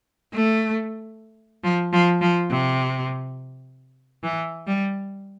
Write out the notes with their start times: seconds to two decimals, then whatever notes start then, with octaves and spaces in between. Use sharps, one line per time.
0.33 A3
1.64 F3
1.93 F3
2.21 F3
2.50 C3
4.23 E3
4.67 G3